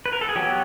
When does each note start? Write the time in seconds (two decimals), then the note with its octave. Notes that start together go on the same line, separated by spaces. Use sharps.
0.06 B4
0.13 A#4
0.21 A4
0.29 G#4
0.36 F#3 B3 G4